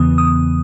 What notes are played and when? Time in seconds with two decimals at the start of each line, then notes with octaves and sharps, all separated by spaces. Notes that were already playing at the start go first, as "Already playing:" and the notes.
Already playing: E2 C#3 E3 B3 D#6
0.18 D#6